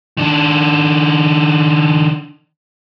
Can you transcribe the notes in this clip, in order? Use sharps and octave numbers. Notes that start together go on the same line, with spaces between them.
D#3 D4